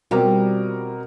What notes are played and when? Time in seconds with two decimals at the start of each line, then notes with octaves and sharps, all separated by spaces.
0.11 B2 G3 C4 F4 G4 A#4